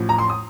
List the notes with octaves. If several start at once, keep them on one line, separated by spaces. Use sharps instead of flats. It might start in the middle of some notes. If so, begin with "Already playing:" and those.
Already playing: A1 A2 F3
A#5
C6
D#6